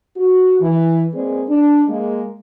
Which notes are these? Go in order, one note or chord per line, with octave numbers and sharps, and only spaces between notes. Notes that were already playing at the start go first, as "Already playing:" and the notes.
F#4
E3
G#3 A#3 C4 G#4 B4 D5
D4
G#3 A#3